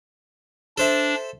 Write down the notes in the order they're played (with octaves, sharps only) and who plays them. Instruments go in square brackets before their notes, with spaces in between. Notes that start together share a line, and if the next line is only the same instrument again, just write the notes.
[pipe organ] D4 [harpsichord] A4 C5 E5